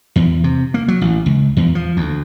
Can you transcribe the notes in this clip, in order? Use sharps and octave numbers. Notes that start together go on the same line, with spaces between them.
E2
C3
A#3
F#3
A1
C#2
E2
F3
D2